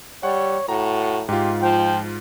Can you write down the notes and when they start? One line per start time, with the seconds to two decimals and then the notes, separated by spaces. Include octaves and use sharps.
0.23 G3 C#5 F#5
0.68 A2 F#4 A#5
1.29 G#2 F4 G4
1.62 F3 G5